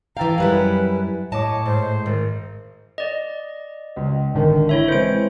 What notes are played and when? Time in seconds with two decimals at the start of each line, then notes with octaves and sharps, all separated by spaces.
0.17 E3 A4 F5 G5 A#5
0.38 F#2 G3 E4 B4 F#5 G#5 B6
1.32 A2 C#5 D#5 A5 D6
1.65 G#2 C5
2.06 G#1
2.98 D5 D#5
3.96 C#2
4.34 G#1 D3 D#3
4.69 E4 C#5 E5
4.88 E3 G#3 C4 C5 D7